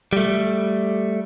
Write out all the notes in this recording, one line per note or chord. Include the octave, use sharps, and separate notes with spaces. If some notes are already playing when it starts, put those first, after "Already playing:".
G3 A3